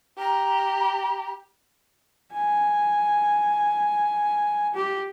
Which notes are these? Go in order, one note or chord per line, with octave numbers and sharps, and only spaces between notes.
G4 A#5
G#5
G4